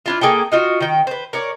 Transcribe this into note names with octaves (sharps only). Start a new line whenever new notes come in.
D4 E4 F4
A#3 G#4 A4 G5
D#4 F4 F#4
D#3 G5
B4 C5
A#4 C#5 D5